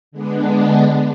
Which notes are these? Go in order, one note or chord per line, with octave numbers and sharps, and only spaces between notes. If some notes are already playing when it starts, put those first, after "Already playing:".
D3 G#3 B3 D4